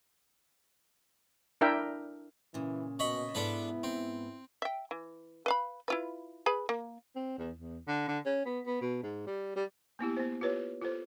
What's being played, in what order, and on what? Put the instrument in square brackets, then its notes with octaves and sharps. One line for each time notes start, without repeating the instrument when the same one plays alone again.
[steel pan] D4 E4 A#4 E5 G5
[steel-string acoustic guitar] A#2 C#3 [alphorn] E3
[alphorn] B2 [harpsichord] C#5 D#5 B5
[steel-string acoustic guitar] G#2 B3 [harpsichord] D4 A4 B4 [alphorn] E4
[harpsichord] C4
[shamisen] E5 G5
E3
B4 F5 B5
E4 F4 B4
G#4 B4 B5
A#3
[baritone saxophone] C4
E2
E2
D3
D3
C#4
B3
B3
B2
G#2
G3
G3
[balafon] A#3 B3 E4 G4
B3 C5
F4 G4 B4 C#5
F4 A4 C5